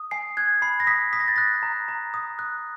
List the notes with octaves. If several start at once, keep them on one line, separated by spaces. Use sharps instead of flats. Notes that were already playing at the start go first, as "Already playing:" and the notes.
Already playing: D#6
G#5 C7
F#6 G#6
B5 C7
A#6
D#6 B6
D#6 B6
A#6
A6
F#6 A#6
A#5
A#5
D#6
F#6